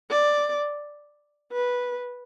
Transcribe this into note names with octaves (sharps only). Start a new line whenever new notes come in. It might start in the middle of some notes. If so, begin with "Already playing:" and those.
D5
B4